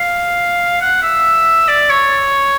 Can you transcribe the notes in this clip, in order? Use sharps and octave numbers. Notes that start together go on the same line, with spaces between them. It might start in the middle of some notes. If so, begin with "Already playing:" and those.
Already playing: F5
F#5
E5
D5
C#5